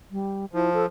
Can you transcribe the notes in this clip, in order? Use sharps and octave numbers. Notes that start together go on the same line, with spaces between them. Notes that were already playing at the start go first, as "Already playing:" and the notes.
G3
F3 E4
A4